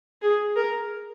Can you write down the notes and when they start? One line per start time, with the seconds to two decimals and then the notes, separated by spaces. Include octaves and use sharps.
0.22 G#4
0.56 A#4